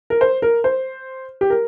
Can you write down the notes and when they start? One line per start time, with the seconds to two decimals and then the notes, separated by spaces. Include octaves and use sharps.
0.10 A#4
0.21 C5
0.42 A#4
0.64 C5
1.41 G4
1.50 A#4